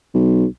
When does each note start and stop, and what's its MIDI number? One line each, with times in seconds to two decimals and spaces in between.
0.14 0.45 35